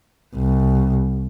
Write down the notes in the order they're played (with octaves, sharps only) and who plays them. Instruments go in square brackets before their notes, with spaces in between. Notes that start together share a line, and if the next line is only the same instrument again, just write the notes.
[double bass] C2